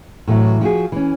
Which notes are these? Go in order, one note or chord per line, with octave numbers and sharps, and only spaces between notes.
A2 D3 E3 F#3
F3 F#4 G#4
E3 C#4